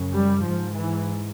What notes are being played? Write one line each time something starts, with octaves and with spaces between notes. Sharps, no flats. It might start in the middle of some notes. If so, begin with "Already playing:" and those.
Already playing: F#2 C#3
G3
G#2 F3
E3